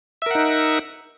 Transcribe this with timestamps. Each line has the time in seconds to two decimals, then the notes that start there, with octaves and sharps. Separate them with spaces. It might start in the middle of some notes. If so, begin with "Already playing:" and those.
0.22 E5
0.26 A#4
0.31 F#5
0.35 D#4